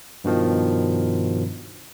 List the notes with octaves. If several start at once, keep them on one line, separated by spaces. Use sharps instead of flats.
G2 B2 D#3 F3